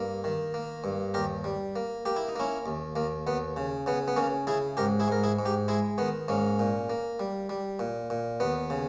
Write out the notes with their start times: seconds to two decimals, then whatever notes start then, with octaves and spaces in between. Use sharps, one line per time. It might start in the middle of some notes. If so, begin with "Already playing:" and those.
Already playing: G2 A#3
0.24 D#3
0.54 A#3
0.84 G2
1.14 D#2 G4 A#4
1.44 G3
1.76 A#3
2.05 A#3 G4
2.16 E4
2.28 D#4
2.36 A#3 C#4 E4
2.66 D#2
2.96 D#2 A#3
3.27 D#2 B3
3.57 C#3
3.86 C#3 B3
4.08 B3
4.16 C#3 A#3 C#4
4.47 C#3 E4 G#4
4.77 G#2 G4 A#4
5.00 E4 G#4
5.08 G#2 A#4
5.24 E4 G#4
5.39 G#2
5.45 D#4 G4
5.68 G#3 E4 G#4
5.98 D#3 B3
6.28 G#2 A#3 C#4
6.59 A#2
6.90 A#3
7.20 G3
7.49 G3
7.79 A#2
8.10 A#2
8.40 D#2 B3
8.70 C#3